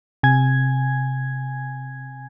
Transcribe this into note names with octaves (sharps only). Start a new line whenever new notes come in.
C3 G#5 G#6